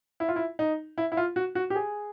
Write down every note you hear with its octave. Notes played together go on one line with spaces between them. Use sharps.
E4
F4
E4
D#4
E4
E4
F4
F#4
F#4
G4
G#4